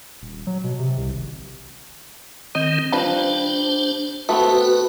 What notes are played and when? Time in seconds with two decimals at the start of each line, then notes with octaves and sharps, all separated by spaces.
0.22 D#1
0.47 F#3
0.64 B2
0.79 C3
0.98 C2
1.13 G#1
2.55 D#3 C4 D#5
2.92 F3 G3 D4 B4 C5
4.29 A3 B3 C4 F#4 B4